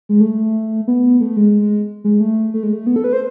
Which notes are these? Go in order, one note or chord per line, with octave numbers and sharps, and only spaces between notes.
G#3
A3
B3
A3
G#3
G#3
A3
A3
G#3
A3
B3
A4
B4
C5